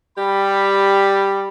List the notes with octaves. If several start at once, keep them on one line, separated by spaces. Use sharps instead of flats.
G3 G4 B5